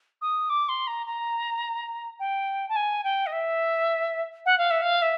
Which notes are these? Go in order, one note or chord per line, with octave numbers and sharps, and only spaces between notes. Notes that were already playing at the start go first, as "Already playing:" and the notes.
D#6
D6
C6
A#5
A#5
G5
A5
G#5
G5
D#5
E5
F#5
F5
E5
F5
E5